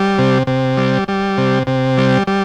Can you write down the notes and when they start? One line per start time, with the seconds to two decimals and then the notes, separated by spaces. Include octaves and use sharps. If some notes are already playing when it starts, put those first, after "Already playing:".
Already playing: G3
0.18 C3
0.47 C3
0.77 G3
1.08 G3
1.38 C3
1.67 C3
1.98 G3
2.27 G3